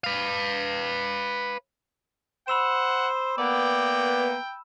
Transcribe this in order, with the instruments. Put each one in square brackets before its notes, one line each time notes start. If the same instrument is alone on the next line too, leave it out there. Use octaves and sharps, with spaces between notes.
[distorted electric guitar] B4 F5
[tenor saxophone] C5 [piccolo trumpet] F#5 [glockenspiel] B5 E6 E7
[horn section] A#3 B3 [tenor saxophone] D5 [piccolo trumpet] G5